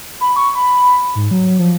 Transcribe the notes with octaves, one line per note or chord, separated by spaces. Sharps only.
B5
C#6
B5
G#2
F#3
F3